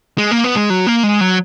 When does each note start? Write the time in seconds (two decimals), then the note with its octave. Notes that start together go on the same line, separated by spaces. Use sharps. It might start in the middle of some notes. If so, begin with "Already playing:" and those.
0.18 G#3
0.31 A#3
0.44 B3
0.56 G#3
0.70 F#3
0.87 A#3
1.03 G#3
1.21 F#3